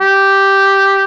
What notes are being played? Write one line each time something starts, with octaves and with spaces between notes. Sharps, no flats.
G4